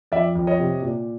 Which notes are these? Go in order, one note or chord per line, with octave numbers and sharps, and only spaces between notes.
F2 D5 E5
F2
C#5 D#5
C3
A#2